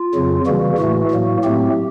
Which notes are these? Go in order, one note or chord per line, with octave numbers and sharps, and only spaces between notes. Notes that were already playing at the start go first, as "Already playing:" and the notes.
Already playing: F4
F2 C#3 F#3
C#3 E3 G3 A#3 F#4
A2 E3 A3 F#4
A2 F#3 A#3
A2 F#3 A3 C4 G4